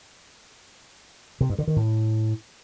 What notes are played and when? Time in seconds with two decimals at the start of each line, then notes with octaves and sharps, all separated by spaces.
1.41 C3
1.50 G2
1.59 D3
1.67 D#3
1.76 A2